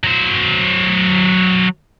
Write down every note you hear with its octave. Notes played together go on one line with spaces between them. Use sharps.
F#3 C5